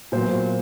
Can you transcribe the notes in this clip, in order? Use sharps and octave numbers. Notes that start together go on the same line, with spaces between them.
A#2 F#3 B3 C5